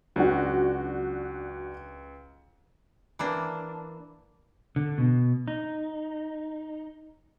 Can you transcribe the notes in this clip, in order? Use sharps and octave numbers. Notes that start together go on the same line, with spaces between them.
C#2 F#3 D4 F#4
E3 A#3 D4
D3
B2
D#4